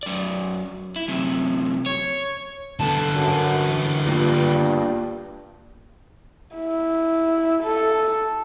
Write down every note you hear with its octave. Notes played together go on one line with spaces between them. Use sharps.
F#2 D5
E4
F#2 C3
C#5
D3 B3 A4 A5
F#2
E3
G2 A#3 F4 B4
E4
A4